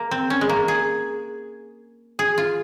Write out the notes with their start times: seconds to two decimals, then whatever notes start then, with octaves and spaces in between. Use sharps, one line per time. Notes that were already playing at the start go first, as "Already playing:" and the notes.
Already playing: A#3
0.11 C4
0.30 C#4
0.41 G#3
0.49 A#3
0.68 G#4
2.19 G#4
2.38 F4